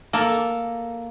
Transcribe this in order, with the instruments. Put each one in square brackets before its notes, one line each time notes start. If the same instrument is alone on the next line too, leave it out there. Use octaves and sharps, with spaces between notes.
[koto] A#3 A4